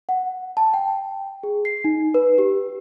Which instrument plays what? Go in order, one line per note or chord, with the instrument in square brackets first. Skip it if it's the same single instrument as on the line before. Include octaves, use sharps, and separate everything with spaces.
[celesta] F#5
A5
G5
G#4
C7
D#4
B4
G4